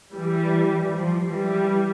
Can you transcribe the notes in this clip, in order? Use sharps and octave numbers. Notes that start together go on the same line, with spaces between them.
E3 G3
F3
E3 G3